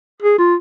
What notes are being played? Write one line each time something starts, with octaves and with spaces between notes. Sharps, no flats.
G#4
F4